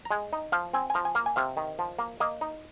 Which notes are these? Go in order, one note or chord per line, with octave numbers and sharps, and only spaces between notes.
A#5
G#3 G#5
D#4
F3 F5
C4 G#5
G#5
F3 A#5
G#5
A#3 F5
G#5
C3 F5
D#3
F3
A#3
A#3 D#5
D#4